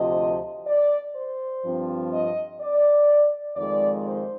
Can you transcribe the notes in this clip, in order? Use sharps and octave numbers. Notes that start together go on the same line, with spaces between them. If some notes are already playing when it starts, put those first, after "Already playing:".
Already playing: D2 C3 F3 D#5
D5
C5
G2 F3 C4
D#5
D5
F2 D#3 G#3 D5
C5